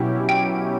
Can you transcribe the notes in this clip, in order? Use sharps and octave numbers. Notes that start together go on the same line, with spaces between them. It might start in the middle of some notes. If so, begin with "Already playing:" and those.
Already playing: B2 F#3 C#4 E4 G4
G5